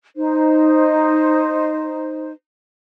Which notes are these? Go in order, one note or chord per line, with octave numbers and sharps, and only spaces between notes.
D#4 C5